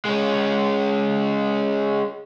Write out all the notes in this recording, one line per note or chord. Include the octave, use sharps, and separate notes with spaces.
G#3 C#4